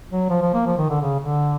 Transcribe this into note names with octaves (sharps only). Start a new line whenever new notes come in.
F#3
F3
F3
A#3
F3
D#3
D3
C#3
D3